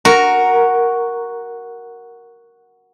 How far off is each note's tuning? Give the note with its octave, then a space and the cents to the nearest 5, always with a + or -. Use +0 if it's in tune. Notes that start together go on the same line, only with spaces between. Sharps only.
F#4 +0 A#4 +0